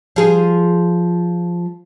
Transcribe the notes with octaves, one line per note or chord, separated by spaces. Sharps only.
F3 G#4